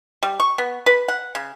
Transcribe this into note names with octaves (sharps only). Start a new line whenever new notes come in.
G3
C#6
B3
B4
F#5
C#3